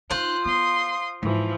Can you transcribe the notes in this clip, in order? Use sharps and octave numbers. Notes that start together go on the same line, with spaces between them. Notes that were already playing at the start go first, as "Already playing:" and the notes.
D#4 F4 C5 F#6
B3 C6 D#6
G#2 E3 F3